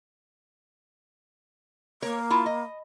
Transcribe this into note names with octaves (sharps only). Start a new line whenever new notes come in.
A#3 A#4 C#5
E4 F4 A5
D#5